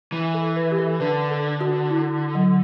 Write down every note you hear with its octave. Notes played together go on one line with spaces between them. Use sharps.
E3
A4
B4
G4
A4
D3 B4
A4
F#4
E4
F#3